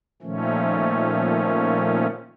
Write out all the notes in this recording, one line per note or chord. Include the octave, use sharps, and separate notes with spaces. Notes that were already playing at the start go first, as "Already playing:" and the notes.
A#2 D#3 F3 A3 C#4